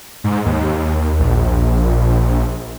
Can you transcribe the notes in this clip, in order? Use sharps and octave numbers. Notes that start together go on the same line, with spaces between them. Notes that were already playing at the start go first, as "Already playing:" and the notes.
G#2
D#2
A#1